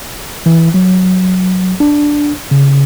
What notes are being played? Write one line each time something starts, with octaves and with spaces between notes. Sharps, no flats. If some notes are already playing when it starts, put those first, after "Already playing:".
E3
F#3
D4
C#3